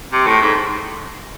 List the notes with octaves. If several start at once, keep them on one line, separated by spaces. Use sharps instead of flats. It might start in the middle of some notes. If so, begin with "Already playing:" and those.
C3
A2
G#2